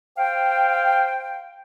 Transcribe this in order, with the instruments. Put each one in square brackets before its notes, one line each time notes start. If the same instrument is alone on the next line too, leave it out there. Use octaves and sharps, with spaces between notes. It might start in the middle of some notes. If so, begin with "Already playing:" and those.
[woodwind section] C5 F5 G5